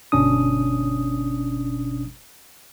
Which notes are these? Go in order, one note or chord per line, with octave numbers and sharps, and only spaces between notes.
G1 B2 C#4 D4 D#6